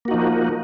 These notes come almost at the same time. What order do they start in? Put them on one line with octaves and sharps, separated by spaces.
A#3 F#4 D#4 F3